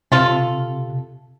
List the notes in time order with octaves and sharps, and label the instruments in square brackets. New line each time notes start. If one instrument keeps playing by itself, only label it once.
[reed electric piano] C3 [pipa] F4 A4